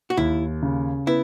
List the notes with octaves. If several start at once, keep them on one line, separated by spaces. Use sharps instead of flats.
F#4
D#2 E4
C#3
B3 E4